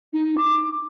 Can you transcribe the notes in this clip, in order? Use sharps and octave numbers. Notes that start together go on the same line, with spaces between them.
D#4
D6